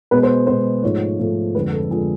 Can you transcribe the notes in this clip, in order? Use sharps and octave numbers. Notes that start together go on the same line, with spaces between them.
B2 G#3 B3 B4
C5
B2 G#3 B3 C5
G#2 F3 A3 C#5
G#2 F3 A3
F2 D3 F3 G#3 B4
A4
F2 D3 F3 G#3 G#4